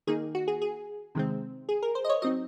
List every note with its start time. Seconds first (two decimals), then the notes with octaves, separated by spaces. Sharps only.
0.07 D#3 A#3 D#4 G#4
0.35 F#4
0.48 G#4
0.62 G#4
1.15 C3 D#3 G#3 C4
1.69 G#4
1.82 A#4
1.95 C5
2.04 D#5
2.09 C#5
2.22 F#3 C4 D#4 D#5